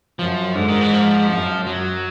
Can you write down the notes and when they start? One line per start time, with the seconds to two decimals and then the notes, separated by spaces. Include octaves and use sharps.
0.19 F#2 F3
0.55 G#2 D3
0.68 D#3
0.81 E3
0.93 F3
1.30 F#2
1.67 F#3